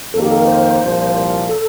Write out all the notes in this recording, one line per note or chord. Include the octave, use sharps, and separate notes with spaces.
F2 D#3 A#3 A4
G4
A4
A#4
C5
C2 A#2 F3
A4